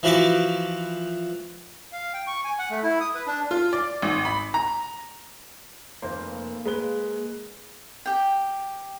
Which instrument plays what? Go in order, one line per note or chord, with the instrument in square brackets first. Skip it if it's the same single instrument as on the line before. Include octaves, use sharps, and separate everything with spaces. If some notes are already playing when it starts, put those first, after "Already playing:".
[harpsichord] E3 F3 F#4 B4 D6
[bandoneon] F5
G5
C#6
G#5
F#5
A3
E4
D#6
B4
D4
[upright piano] F4
D5
G#1
B5
A#5
[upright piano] F1 C5 [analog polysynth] A#3
[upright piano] G#3 B4 G7
[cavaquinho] G4 G5